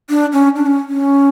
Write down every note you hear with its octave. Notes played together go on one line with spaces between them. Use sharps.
D4
C#4
D4
C#4
C#4